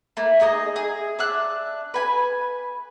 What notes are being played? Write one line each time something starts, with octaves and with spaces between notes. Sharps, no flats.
A3 A#3
D#4 G#4 D5 D#5
G#4
D4 E5 F#6
B4 G#5 B5